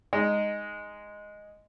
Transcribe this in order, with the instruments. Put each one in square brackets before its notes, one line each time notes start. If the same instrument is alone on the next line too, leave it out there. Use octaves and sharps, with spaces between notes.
[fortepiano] G#3 D#4